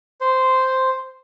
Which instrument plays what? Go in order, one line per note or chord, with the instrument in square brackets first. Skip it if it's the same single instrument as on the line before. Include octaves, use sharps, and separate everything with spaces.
[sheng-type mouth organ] C5